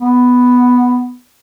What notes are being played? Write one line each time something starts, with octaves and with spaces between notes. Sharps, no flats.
B3